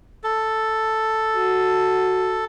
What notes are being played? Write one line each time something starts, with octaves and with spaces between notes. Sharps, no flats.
A4
F#4